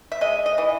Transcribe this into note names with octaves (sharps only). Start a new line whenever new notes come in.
E5
G#3 D#5
D#5
E3